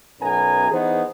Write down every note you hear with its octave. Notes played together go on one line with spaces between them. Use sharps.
B1 F#2 B3 G#5 A#5
E3 B3 D#4 G#4 C5